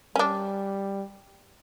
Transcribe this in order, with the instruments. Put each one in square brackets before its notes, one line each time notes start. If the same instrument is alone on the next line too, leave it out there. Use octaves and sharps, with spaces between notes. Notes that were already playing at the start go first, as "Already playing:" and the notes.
[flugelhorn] G3 [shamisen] C#4 D4